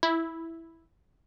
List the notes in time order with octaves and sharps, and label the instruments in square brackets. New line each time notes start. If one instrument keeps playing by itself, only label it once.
[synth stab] E4